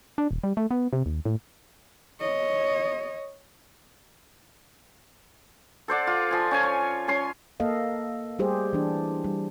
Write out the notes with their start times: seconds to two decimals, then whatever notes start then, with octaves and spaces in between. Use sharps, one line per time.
0.18 D4
0.31 D#1
0.44 G3
0.57 A3
0.71 B3
0.93 C3
1.06 D#2
1.25 A2
2.20 C#5 D#5
5.88 A4 C5 D5 F#5
6.07 F4
6.31 F3 G#5
6.51 C#4 C5 G#5
6.63 C#5
7.08 C#4 G#5 C6
7.60 A#3 A4 D#5 F5
8.39 G3 A3 G4 G#4 C5
8.73 E3 D4
9.24 G3